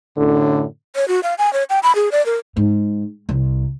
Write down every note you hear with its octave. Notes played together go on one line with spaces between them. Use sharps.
F#2 A2 D3
C#5
F#4
F5
G#5
C#5
G5
B5
G#4
D5
A#4
G#2
C2